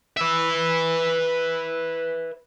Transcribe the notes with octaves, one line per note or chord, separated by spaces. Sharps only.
B4 E5